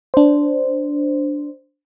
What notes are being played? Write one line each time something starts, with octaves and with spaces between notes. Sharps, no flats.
D4 C5